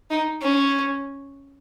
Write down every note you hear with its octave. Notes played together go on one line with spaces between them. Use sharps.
D#4
C#4